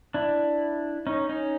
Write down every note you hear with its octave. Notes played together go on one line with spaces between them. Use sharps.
D4 E4
C#4 D#4
C#4 D#4